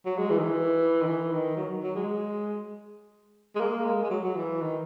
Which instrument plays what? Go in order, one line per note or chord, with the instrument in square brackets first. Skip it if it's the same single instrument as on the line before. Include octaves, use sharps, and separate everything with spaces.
[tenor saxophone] F#3
G#3
E3
D#3
E3
D#3
E3
D#3
F#3
F#3
G#3
G#3
A#3
G#3
G#3
F#3
F#3
E3
D#3